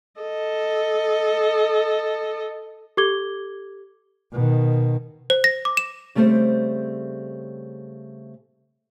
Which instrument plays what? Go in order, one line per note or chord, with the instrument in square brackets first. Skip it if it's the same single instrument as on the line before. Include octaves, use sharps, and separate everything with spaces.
[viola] A4 D#5
[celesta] G4 A4 D6 G#6 G7
[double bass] B2 D#3
[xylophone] C5
A#6
D6
E7
[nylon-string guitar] C#3 G3 A3 C4 C5